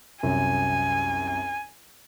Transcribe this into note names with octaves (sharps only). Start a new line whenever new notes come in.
C2 F#2 G#5